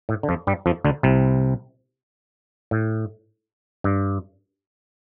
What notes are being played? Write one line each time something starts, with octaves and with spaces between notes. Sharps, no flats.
A2
D3
F2 F3
G2 G3
F2 F3
D2 D3
C2 C3
A2
G2